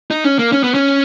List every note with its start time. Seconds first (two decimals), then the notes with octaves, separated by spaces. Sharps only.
0.11 D#4
0.24 C#4
0.39 A#3
0.52 C#4
0.64 B3
0.74 C#4